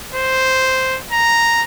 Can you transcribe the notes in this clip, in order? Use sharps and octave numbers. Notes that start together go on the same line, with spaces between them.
C5
A#5